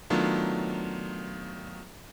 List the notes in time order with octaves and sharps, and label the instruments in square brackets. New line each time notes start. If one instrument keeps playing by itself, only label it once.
[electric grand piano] D#3 F#3 A3 B3 D4 F4